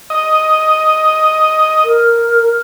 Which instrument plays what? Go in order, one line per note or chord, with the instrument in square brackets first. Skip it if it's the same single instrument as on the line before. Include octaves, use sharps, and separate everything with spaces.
[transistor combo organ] D#5
[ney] A#4